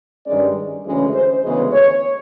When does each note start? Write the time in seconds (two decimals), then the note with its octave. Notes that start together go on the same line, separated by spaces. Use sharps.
0.24 G2 D#3 G#3 C#4 D5
0.84 D2 C#3 E3 G#3 C#4
1.13 C5
1.42 D2 C#3 E3 G#3 B3
1.72 C#5